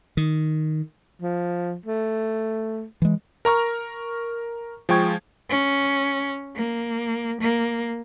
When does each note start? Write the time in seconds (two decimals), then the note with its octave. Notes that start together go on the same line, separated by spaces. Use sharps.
0.17 D#3
1.22 F3
1.86 A3
3.02 E3 G#3
3.45 A#4 A#5 C#6 F6
4.89 F3 G#3 G5 C#6 G#6
5.50 C#4
6.56 A#3
7.41 A#3